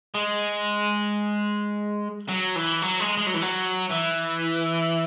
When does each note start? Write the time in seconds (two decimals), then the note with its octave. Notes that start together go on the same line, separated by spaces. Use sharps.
0.14 G#3
2.29 F#3
2.56 E3
2.82 F#3
3.00 G#3
3.18 G#3
3.27 F#3
3.34 E3
3.42 F#3
3.90 E3